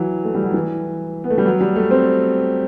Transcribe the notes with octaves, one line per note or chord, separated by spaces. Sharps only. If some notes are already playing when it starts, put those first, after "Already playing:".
Already playing: E3 F#3
A3
G3
F#3
E3
B3
A3
G3
F#3
G3
A3
C4